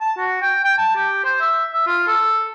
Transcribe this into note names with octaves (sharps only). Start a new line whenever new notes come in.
A5
F#4
G5
G5
A5
G4
C5
E5
E5
F4
A4